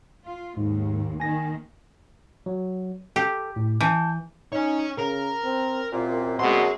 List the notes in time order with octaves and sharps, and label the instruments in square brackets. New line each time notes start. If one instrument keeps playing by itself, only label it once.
[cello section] F4
[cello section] D#2 [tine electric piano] G#2
[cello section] D#3 A#3 [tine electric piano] G#5 A#6
[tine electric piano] F#3
[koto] G4 [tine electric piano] A4
[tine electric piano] A2
[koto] E3 [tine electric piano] A5 G6
[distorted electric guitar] C#4 C#5 [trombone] D#4
[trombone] C#3 [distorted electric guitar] A#4
[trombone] C4
[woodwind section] C2 F#2 A#2 [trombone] C4
[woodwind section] F#2 F#3 [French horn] B2 [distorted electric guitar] G#4 C6